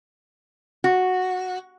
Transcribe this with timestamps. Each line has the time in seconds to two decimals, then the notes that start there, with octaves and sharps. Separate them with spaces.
0.84 F#4